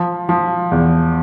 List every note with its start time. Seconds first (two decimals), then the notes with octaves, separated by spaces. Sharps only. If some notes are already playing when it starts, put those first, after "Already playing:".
Already playing: F3
0.29 F3
0.72 E2